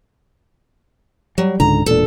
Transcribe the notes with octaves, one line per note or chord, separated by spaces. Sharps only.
F#3 G3
C#2 G#2 D3 A#5
E1 A#2 D4 A4